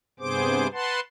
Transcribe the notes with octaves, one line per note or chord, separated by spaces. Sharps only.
G2 C3 B3 G#4 C5 D6
B4 F#5 A5 C6